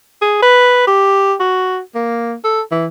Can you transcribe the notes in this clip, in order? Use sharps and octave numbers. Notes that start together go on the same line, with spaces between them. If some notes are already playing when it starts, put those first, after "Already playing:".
G#4
B4
G4
F#4
A#3
A4
E3